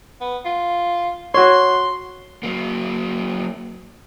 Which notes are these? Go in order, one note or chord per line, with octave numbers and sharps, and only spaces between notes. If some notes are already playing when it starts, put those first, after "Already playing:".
B3
F4
F#4 C#5 C6
F#3 A#3